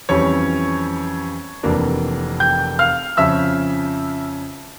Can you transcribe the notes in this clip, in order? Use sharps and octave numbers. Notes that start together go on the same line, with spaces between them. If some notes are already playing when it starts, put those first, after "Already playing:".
F2 E3 G3 C#4 C#5 C#6
F1 F2 E3 A#3 D4
G5 G6
F5 F6
F2 C#3 F3 C#4 E5 E6